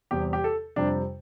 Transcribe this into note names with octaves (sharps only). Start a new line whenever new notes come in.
E2 C3 G3 G4
G4
A4
F2 C3 G3 D4